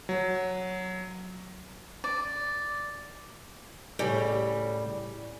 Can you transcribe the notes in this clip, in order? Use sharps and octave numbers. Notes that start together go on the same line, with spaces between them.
F#3
D5
A2 C#3 G3